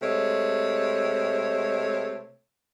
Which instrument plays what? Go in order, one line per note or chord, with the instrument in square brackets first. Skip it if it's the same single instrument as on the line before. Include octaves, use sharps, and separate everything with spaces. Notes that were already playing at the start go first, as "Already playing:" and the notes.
[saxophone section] C3 G#3 A3 C#5